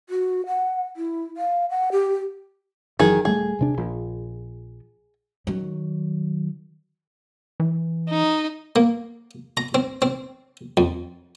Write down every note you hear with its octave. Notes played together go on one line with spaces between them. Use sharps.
F#4
F#5
E4
F5
F#5
G4
F#1 D#3 E3 F#3 G#4
D#1 G3 A3 G#4
D#1 C3 D4
A#1 F3
D#3 F#3
E3
D#4
A#3
A#5
C4
C4
F2